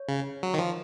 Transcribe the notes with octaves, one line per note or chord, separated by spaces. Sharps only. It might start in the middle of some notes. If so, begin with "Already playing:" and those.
Already playing: C#5
C#3
F#3
D#3
F3